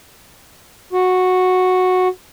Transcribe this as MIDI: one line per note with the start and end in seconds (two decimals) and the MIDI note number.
0.93 2.08 66